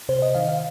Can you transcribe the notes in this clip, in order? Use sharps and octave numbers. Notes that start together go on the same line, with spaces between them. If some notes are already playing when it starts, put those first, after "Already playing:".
C3 C5
D#5
D#3 F5
F5